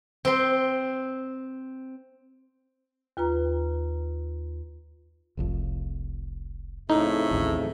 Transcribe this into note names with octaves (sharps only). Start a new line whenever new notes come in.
C4 C6
D#2 F4 B4 A#5
F1 C2 F2
F2 A2 C#3 A3 D#4
A1 D#2